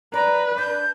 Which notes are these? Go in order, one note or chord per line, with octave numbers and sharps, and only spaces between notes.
B4 D5 A#5
D4 G6